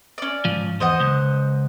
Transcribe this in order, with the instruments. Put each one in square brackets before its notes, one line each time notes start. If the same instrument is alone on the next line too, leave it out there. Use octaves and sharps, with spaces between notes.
[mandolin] C#4 D5
[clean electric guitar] G#2 F3
[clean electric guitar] E2 [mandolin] C5 D#5 F#5
[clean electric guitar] C#2